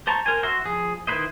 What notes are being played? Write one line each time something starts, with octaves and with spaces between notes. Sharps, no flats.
C5 A5 A#5 C#6
A#4 C5 G#5
F#4 C5 E5 C6
F3 G#4
D#3 E4 B4 C5 D#5